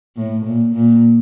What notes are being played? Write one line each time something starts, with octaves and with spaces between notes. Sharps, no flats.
A2
A#2
A#2